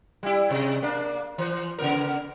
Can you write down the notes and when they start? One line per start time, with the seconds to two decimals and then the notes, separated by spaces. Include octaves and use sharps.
0.23 G3 E4
0.50 C3 D#5
0.82 A#3 D4
1.38 E3
1.79 C#3 B3 A#4